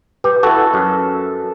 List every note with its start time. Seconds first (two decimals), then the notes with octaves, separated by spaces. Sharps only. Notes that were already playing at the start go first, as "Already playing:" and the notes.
0.24 G4 B4
0.43 E4 F#4 A4
0.74 F#2